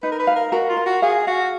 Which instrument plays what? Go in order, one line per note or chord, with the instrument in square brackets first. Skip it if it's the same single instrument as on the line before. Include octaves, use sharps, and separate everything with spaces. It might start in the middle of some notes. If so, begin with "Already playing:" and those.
[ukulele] D#4 [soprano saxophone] B4
[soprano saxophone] A#4
B4
[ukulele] F5
[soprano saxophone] A#4
[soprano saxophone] F#4 [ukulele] A#4
[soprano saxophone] F4
[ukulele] A#4
[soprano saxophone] F#4
[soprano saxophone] G#4 [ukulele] F5
[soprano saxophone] F#4 [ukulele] F5